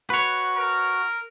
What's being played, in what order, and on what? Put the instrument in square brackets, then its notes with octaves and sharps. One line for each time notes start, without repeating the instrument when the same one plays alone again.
[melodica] F#4 [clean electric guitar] B4 C#5
[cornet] A#4